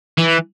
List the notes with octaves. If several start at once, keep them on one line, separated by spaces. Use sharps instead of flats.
E3